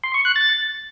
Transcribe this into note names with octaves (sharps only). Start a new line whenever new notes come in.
C6
C#6
F#6
A6